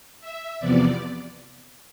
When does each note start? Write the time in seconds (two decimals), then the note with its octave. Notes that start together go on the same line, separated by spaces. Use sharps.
0.21 E5
0.60 E2 C3 F3 B3 D5